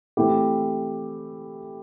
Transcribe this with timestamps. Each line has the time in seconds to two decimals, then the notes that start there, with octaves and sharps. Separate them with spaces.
0.17 E3 A3 C4 E4 G4